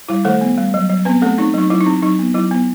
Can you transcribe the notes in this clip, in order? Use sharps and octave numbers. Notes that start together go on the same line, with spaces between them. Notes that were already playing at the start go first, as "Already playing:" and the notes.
G3 E4
D#3 A3 A4
B3
G3
F#3
F#3
B3 C4 B4
A3 C4 A4
C4 D#4
F#3 D#4
F#3 E4
D#4
C4
F#3 D#4
B3
F#3 E4
B3